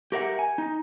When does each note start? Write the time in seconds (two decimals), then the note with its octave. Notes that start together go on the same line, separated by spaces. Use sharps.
0.12 G4 A#4 E5 F#5
0.39 G#5
0.58 D#4